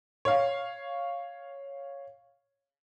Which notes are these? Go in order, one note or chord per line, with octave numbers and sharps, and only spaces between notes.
C#5 F5